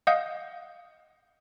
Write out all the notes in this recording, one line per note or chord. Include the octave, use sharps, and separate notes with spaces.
D#5 F5 F#5 D#6 G6